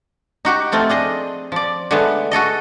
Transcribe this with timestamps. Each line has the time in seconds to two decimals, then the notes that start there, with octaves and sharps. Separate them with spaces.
0.45 D#4 F#4 G4
0.72 F3 A3 C4 F4
0.89 D4 G#4 D#5
1.52 F3 D5
1.91 D3 G#3 A3 B3
2.31 F#4 G#4 A4 D#5